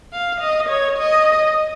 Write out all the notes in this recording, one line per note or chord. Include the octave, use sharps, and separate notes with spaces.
F5
D#5
C#5
D#5